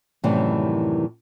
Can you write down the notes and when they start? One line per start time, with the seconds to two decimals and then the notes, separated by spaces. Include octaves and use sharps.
0.23 F#2 A2 C3 D#3 E3 G3